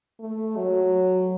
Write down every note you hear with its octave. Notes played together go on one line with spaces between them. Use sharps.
A3
F#3